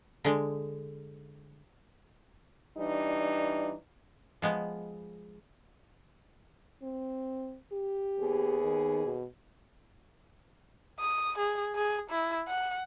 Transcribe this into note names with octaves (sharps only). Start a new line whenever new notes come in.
D3 G#3
E3 G3 D4 D#4
F3 G#3 B3
C4
G4
D#2 B3 G#4
D#3
B2
D#6
G#4
G#4
E4
F#5